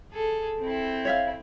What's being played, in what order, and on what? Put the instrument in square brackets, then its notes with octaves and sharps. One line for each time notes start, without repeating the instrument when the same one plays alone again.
[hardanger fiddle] G#4 A4
C4 E4
[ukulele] C#5 E5 F5